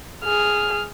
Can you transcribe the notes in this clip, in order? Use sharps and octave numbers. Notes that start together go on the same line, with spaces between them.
G#4 F6